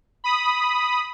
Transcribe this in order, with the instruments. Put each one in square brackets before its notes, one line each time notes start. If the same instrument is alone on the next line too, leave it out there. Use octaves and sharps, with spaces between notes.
[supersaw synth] B5 D#6